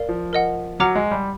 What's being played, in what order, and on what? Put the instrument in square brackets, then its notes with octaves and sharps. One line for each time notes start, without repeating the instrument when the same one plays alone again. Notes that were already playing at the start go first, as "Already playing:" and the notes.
Already playing: [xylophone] A#4 D5 F5
[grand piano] F3
[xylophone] A#4 D#5 F#5
[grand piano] F#3 [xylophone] F#5 A#5 D6 F6
[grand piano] G#3
G3